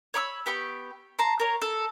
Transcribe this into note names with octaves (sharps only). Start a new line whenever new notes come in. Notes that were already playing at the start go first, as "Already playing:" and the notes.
C#5 B5 D6 E6
B3 G4 G5 C#6
A5 A#5 C6
A#4 C#5
A4